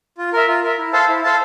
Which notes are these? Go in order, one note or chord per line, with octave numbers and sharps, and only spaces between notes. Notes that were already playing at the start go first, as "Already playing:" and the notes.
F4
A#4 E5
F4
A#4 E5
E4
A4 C5 F5 A5
E4
A4 C5 F5 A5